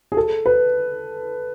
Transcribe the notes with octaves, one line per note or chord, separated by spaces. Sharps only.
G#4
A4
B4